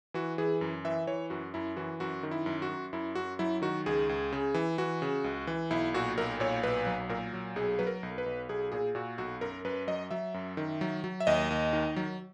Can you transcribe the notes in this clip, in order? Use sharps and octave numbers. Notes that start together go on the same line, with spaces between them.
E3 F#4
E3 G#4
F#2
E3 E5
E3 C#5
F#2 F#4
F#2 E4
E3 F#4
F#2 F#4
D#3
E4
F#2
F#4
F#2
F#2 E4
F#2 F#4
F#3 E4
D#3 F#4
C#2 G#4
C#2
C#3
E3
E3 F#4
C#3
C#2
E3
B1 E4
A#2 F#4
B1 A#4
A#2 C#5
B1 B4
F#3
A#2 A#4
F#3
B1 G#4
F#3 B4
A#4
B1
B4
B1
B1 G#4
A#2 G#4
A#2 F#4
B1 F#4
F#2 A#4
F#2 B4
F#3 D#5
F#3 E5
F#2
D#3
F#3
F#3
E5
D#2 D#5
D#2
D#3
F#3